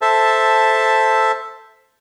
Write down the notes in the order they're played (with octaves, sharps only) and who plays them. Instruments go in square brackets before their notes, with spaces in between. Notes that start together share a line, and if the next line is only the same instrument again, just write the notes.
[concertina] A4 C5 E5 A5